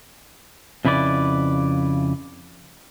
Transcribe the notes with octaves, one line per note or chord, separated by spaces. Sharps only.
F2 C#3 E4 B4 D5